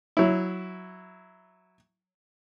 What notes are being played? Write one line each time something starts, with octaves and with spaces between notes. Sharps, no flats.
F#3 E4